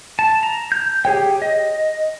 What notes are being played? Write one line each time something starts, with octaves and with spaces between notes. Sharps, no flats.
A5
A#5
G6
G4 G#4 C#5 G5
D#5